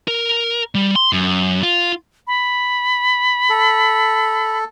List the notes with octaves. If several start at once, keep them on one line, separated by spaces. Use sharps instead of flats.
A#4
G3
C6
F#2
F4
B5
A4